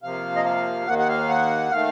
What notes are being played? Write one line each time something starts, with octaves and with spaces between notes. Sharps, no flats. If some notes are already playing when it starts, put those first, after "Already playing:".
C3 F3 A#3 F5
D#5
F5
D#2 D#3 A#3 F#5
F#5
F5
F#5
D#3 A3 F5